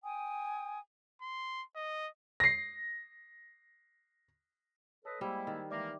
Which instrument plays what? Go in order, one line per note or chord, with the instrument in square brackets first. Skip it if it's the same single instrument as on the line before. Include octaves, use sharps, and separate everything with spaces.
[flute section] G5 G#5 D#6
[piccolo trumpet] C6
D#5
[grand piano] A#6 C7
[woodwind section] A4 B4 D#5 [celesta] C#5
[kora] G3 [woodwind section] G#3 A#3 E4 [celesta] G4 C5
[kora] D#3
[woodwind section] E3 G#3 A#3 [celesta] D5 E5 D6